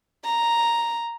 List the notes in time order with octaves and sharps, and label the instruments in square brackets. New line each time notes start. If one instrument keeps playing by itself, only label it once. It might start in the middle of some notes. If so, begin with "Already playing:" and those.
[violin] A#5